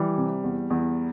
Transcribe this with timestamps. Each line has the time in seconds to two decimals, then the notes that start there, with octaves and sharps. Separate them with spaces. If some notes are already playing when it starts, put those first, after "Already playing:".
Already playing: E3 G3
0.17 C3
0.44 E2
0.70 E2